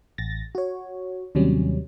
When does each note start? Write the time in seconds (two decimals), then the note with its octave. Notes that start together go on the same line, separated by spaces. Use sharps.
0.18 A1 A6 A#6
0.55 F#4 C#5
1.35 D#2 C3 F#3 G3 C#4